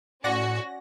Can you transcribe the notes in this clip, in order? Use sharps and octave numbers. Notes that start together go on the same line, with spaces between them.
A2 C#4 F#4 D5 F#5 A#6